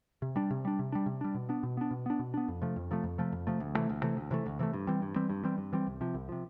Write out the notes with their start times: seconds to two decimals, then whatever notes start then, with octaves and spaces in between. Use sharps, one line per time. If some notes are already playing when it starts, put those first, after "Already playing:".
0.22 C3
0.36 G3 D4
0.51 C3
0.65 G3 D4
0.79 C3
0.92 G3 D4
1.06 C3
1.21 G3 D4
1.35 B2
1.49 B3 D4
1.63 B2
1.77 B3 D4
1.91 B2
2.06 B3 D4
2.19 B2
2.34 B3 D4
2.48 F2
2.62 C3 F3 A3
2.76 F2
2.91 C3 F3 A3
3.04 F2
3.18 C3 F3 A3
3.32 F2
3.47 C3 F3 A3
3.60 D2
3.75 C3 E3 A3
3.89 D2
4.02 C3 E3 A3
4.17 D2
4.31 C3 E3 A3
4.46 D2
4.59 C3 E3 A3
4.73 G2
4.87 E3 G3 C4
5.02 G2
5.16 E3 G3 C4
5.30 G2
5.44 E3 G3 C4
5.58 G2
5.73 E3 G3 C4
5.87 C2
6.01 C3 F3
6.14 C2
6.29 C3 F3